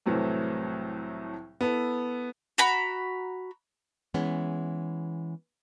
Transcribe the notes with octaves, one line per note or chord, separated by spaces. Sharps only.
C2 A2 E3 F#3 A3 C4
B3 E4 A4
F#4 A#5 B5
E3 G#3 B3 C#4